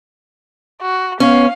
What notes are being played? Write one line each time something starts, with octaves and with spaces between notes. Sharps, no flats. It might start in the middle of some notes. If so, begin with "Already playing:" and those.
F#4
B3 C#4 F5